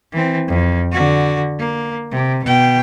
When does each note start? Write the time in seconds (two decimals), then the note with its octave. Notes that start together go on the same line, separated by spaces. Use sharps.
0.12 E3 C4
0.48 F2
0.92 D3 F#4
1.59 A#3
2.11 C3
2.44 B2 G5